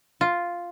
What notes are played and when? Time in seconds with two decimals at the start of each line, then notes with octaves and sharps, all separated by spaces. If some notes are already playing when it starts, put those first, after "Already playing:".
0.21 F4